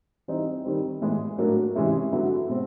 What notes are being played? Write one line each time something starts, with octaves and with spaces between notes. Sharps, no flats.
E3 G3 C4 D#4
D#3 G3 C4
A2 E3 G#3 B3 E4
A2 F#3 A#3 D4
C3 E3 G#3 C#4 E4
D3 F#3 B3 E4
B2 G#3 C4